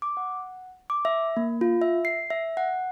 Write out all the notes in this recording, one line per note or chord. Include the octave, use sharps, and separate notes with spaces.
D6
F#5
D6
E5
A#3
F4
E5
C7
E5
F#5